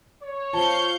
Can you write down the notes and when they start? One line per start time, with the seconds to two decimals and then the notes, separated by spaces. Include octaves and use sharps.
0.22 C#5
0.53 F3 C4 F5 A5 G6 C#7